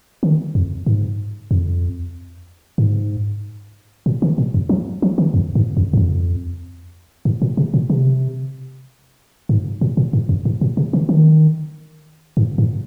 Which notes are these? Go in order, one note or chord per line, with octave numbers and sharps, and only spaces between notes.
D#3
F2
G#2
F2
G#2
A#2
D#3
A#2
F2
F3
F3
D#3
F2
G#2
F2
G#2
F2
G#2
A#2
C3
A#2
C3
G#2
A#2
A#2
G#2
F2
G#2
A#2
C3
D#3
D#3
G#2
G#2